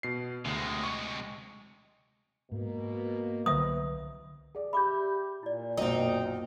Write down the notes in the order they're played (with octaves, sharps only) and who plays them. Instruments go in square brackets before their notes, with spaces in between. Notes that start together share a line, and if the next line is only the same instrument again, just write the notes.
[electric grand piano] B2 C7
[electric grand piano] D2 [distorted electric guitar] C3 G#3
[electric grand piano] C#6 C#7
[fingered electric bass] G#2 [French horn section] B2 A#3
[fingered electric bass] C2 D3 F#3 [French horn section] B4 [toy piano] E5 D#6
[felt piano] G#4 D5
[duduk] G4 [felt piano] E5 G6 [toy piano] B5 D6
[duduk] A#2 [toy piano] E4 D5
[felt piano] B1 F#2 A#3 [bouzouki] C4 D#4